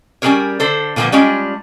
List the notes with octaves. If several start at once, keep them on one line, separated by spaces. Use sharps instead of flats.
G3 C#4 E4 G#4 A#4 C#5
D3 A4 C5
A#2 D3 F3 G3 A#3 B3
G3 G#3 C#4 D4 F4